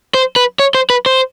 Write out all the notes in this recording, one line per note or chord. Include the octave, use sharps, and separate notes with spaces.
C5
B4
C#5
C5
B4
C5